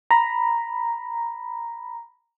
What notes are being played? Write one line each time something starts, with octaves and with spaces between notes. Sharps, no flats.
A#5 B5